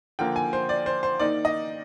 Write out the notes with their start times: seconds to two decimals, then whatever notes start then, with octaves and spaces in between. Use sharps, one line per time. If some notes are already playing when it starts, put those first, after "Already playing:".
0.19 D3 F3 A#3 G5
0.36 G#5
0.53 C5
0.69 D5
0.86 C5
1.03 C5
1.19 D#3 A#3 D#4 D5
1.45 D#5